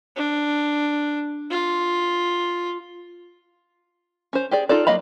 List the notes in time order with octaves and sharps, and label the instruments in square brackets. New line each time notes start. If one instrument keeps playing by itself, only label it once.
[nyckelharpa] D4
F4
[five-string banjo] C#4 C5
G4 G#4 D5
D#4 F4 A4 D5
F#3 A#3 D#5 F5 B5